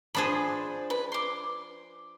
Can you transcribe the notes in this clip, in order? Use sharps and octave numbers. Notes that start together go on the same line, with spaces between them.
F3 D4 G#4 C5 B5
B4
C6 D6